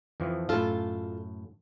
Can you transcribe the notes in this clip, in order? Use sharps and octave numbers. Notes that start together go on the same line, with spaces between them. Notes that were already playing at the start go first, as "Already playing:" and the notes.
F2 E3 F3
F#2 A2 F4 A4